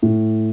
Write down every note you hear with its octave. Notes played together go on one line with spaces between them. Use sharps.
A2